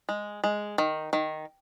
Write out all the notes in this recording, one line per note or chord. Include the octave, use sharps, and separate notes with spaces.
G#3
G#3
D#3
D#3